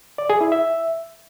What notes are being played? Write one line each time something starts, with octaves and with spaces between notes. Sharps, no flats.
D5
G#4
E4
E5